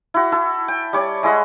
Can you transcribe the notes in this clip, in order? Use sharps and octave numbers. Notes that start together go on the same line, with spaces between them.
E4 F#4
E4 A4
G5
G3 C#5 D5
G#3 E4 D#5 F#5